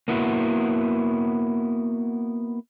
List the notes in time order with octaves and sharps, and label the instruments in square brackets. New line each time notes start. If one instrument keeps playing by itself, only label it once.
[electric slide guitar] A#3 B3 E4 F#4